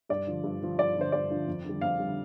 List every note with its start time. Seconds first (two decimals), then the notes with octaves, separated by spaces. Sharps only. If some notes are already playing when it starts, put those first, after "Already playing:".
0.09 G2 D5
0.27 D3 F3
0.44 G2
0.61 D3 F3
0.78 G2 D5
0.96 D3 F3 C5
1.12 G2 D5
1.30 D3 F3
1.47 F2
1.65 D3 G3
1.81 F2 F5
2.00 D3 G3